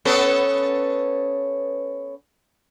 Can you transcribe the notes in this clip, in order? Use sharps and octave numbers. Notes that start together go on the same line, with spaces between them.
B3 C#4 A4